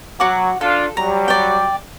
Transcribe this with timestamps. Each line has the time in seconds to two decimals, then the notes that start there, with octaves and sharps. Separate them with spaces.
0.20 F#3 F#4 F#5 D6
0.61 D4 F4 A4
0.97 F#3 G3 A#5
1.28 D5 G5